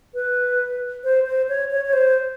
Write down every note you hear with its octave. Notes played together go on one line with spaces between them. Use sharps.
B4
C5
C5
C#5
C#5
C#5
C5